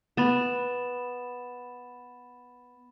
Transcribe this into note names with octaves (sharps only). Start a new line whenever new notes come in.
B3 B5 A6 E7